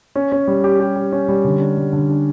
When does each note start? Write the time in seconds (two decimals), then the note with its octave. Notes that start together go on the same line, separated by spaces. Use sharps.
0.15 C#4
0.32 C#4
0.48 G3
0.64 G4
0.80 G4
0.96 G4
1.12 C#4
1.28 G3
1.44 D3
1.60 D4
1.77 G3
1.93 D3
2.09 D4